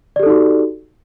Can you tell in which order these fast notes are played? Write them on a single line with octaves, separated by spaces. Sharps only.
D5 G4 A4 D#4 F#4